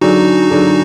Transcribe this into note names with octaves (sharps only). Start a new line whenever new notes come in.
D3 F#3 D4 D#4 F#4 G#4
D3 F#3 D4 G#4